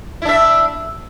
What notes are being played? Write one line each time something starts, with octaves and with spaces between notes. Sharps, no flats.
D4 E4 E5